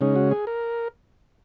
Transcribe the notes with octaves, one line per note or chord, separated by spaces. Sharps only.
C#3 G#3 C#4 D#4
F#4
G#4
A#4